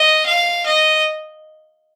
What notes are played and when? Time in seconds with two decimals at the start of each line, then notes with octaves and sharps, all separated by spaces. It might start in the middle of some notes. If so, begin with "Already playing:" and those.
Already playing: D#5
0.26 F5
0.66 D#5